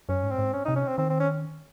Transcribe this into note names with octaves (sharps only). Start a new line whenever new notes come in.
F#2 C#4
G#2
C4
G#2
C#4
C3 D#4
C#4
C4
D#3 C4
C4
C#4